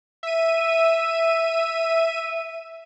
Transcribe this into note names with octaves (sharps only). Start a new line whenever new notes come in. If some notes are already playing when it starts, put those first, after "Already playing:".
E5 D#7